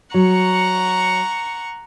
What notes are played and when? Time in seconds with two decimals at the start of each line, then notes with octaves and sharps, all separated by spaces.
0.14 F#3 F#5 A#5 C#6